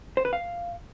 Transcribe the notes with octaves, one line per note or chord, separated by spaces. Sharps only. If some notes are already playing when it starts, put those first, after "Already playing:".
C5
B4
F5